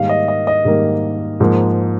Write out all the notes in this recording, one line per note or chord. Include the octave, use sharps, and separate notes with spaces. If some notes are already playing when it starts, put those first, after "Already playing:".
Already playing: G#2 D#3 G3 A#3 F5
D#5
D#5
D#5
G#2 D#3 G3 A#3
G#2 F3 A#3